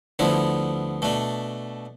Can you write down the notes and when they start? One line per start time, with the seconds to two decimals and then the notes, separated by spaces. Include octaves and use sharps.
0.19 D2 D3 F3 B3 E4
1.02 B2 A3 D4